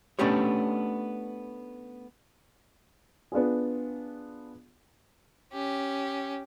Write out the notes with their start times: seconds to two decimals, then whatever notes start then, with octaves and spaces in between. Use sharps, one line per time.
0.19 A3 B3 C#4 D4 G4 C#5
3.32 B3 D4 F4 G#4
5.53 C#4 G4